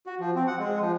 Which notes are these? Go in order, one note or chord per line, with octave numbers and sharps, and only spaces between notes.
F#4
F3
C4
F#5
G#3
F3